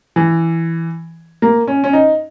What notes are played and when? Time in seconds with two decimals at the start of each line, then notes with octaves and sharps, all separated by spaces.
0.16 E3
1.42 A#3
1.68 C#4
1.84 C#4
1.93 D#4